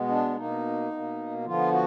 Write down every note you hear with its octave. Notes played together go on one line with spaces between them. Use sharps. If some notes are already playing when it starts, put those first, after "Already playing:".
Already playing: B2 G#3 B3
D4
B2 A#3 D#4
B2 A#3
D3 F3 B3 F4
F#4